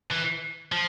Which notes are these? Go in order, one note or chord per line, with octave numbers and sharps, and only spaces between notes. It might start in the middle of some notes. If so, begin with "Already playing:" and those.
E3
F3